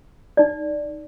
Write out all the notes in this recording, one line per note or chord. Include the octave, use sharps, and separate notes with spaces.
D#4 D5